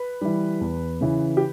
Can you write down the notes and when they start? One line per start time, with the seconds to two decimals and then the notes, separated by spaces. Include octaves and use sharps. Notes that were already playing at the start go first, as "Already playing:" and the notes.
Already playing: B4
0.21 E3 G3
0.61 E2
1.01 C#3 E3
1.37 G4